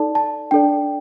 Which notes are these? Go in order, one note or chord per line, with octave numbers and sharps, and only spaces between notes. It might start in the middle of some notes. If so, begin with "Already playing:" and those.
Already playing: D#4 A4 D5 A5
A5
D4 A4 D5 G5